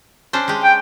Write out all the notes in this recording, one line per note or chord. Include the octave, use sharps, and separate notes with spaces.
C#4 D4 C5
G#3 G4
G5